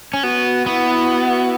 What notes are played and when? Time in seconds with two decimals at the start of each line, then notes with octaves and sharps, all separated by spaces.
0.14 C#4
0.23 B3 F#4
0.66 B3 E4